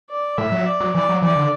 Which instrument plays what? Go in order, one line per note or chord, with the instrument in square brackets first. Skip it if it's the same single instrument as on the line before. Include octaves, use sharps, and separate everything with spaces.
[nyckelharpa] D5
[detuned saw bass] A2 [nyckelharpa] E5
[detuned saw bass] F#3
[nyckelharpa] D5
[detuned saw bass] F#3
[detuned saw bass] E3 [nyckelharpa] D5
[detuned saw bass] F#3
[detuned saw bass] E3 [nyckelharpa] D5
[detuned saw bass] D3